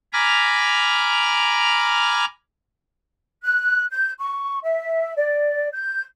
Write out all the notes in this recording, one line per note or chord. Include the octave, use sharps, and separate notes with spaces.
G#5 A#5 B5 D6 F6
F#6
G6
C#6
E5
D5
G6